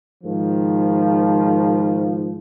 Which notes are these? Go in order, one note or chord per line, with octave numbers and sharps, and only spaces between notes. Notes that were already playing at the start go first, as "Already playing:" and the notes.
G#2 D#3 F3